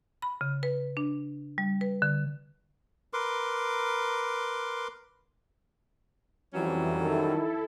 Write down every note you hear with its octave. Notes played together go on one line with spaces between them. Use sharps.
B5
C#3
B4
D4
G3
B4
D3
A#4 B4 C6 D6
F2 E3 F#3 G3 C#4
D#3 E4 A4